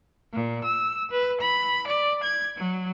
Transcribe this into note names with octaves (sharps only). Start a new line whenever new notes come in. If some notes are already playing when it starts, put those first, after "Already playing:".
A#2
E6
B4
B5
D5
G#6
F#3